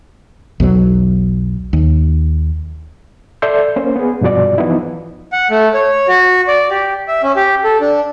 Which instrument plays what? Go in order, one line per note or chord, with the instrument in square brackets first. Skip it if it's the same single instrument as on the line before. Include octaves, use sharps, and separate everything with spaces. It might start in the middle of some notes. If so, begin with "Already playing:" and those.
[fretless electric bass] B1 E2 F#3
D#2
[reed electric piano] A4 D5 E5 C6 G6
A#3 C#4 C5
B3 G#4
G2 B2 F3 F#4 D5
E3 F3 B3 D#4 E4
[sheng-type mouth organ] F#5
A3
C#5
F#4
D5
G4
E5
C#4
G4
A4
D4